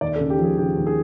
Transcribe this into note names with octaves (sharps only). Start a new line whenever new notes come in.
D#2 D5
A4
C#3
G4
F3 G#4
C#3 G4
D#2
G#4